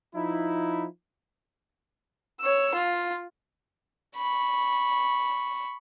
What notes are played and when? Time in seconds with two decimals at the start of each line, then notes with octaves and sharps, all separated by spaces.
0.14 F3 D#4 E4
2.41 C#5 E6
2.74 F4
4.16 B5 C#6